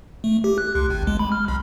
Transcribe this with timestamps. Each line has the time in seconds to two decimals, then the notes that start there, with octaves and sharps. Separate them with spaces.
0.24 A3
0.44 G4
0.58 F#6
0.75 C#2
0.90 G#1
1.07 G#3
1.19 B5
1.32 F6
1.48 B1